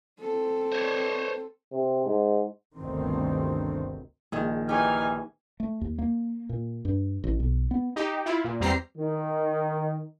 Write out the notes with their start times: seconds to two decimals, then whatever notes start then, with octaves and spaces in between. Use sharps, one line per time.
0.20 C4 A4
0.72 C5 C#5
1.72 C3
2.06 G#2
2.77 G1 D2 C3 D#3 C4
4.32 A#1 D#3 G#4
4.69 E3 D#4 G4 C#5 G#5 F6
5.60 A3
5.81 D#2
5.99 A#3
6.49 A#2
6.85 G2
7.24 A1
7.40 B1
7.71 B3
7.96 D#4 G4
8.26 E4 F4
8.45 A#2
8.60 E2 G3 C4 G4 A#5 C7
8.98 D#3